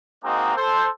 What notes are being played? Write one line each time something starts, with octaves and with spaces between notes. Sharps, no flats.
G#3 A#3 C4 D#4 F#4
A4 C5